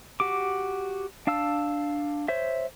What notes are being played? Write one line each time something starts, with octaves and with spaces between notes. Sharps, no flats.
F#4 G4 D6
D4 F5 A5 E6
C5 C#5 E5